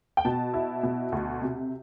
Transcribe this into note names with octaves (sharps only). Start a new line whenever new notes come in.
G5
B2 A5
E4
B2
D2
C3